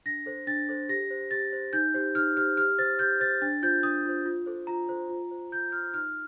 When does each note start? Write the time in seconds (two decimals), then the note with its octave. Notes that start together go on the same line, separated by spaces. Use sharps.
0.06 D4 A#6
0.26 A4 C5
0.47 D4 A6
0.69 A4 C5
0.89 G4 A#6
1.10 C5
1.31 G4 A6
1.53 C5
1.73 D#4 G6
1.94 G4 C5
2.15 D#4 F6
2.37 G4 C5 F6
2.57 G4 F6
2.78 C5 A6
2.99 G4 G6
3.20 C5 A6
3.42 D4 A6
3.62 F4 C5 G6
3.83 D4 D#6
4.05 F4 C5
4.26 F4
4.46 A4 C5
4.67 F4 A#5
4.89 A4 C5
5.09 F4
5.31 C5
5.52 F4 G6
5.72 C5 F6
5.94 D#4 F6